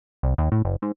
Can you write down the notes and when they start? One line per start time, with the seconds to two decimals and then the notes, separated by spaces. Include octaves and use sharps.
0.23 C2
0.38 D#2
0.52 A2
0.65 F#1
0.82 G#2